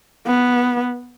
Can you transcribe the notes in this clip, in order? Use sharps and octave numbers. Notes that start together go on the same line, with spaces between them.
B3